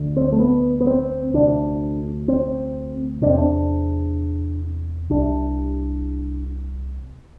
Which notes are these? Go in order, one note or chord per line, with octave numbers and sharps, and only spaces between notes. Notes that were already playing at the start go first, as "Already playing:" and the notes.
Already playing: D2 D3
C4
A3
B3
B3
C4
D2 C3 D4
C4
E2 C3 C4 D4
D4
C2 C3 D4